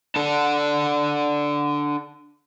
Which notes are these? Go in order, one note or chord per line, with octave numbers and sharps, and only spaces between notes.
D4 A4